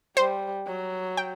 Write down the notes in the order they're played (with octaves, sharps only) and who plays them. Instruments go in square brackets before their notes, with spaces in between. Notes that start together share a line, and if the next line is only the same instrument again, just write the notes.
[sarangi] G3 [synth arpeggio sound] C5
[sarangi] F#3
[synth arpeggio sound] G5